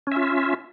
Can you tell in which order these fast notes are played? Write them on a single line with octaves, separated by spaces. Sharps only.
C#4 E5 F4